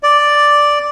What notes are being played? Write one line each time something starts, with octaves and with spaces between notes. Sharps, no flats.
D5